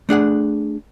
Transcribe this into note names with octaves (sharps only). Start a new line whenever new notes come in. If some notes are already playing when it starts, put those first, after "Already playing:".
A3 D4 G#4 F#5